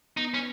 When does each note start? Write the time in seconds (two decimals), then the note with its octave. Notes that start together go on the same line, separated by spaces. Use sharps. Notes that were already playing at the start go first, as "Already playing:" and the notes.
0.17 B3 D#4
0.34 C#4